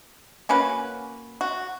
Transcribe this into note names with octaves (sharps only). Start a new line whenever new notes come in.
A#3 C#4 F#4 B4
F#4